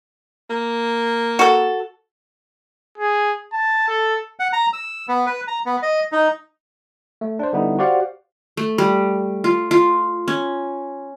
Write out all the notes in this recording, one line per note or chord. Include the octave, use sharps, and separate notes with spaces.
A#3
F#4 A4
G#4
A5
A4
F#5
A#5
E6
B3
B4
A#5
B3
D#5
D#4
A3
D4 C5
D3 G3 B3 D#4 E4
F#4 G4 C5 D5 F5 F#5
A3
G3
F4
F4
C#4